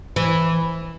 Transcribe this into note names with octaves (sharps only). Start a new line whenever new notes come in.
E3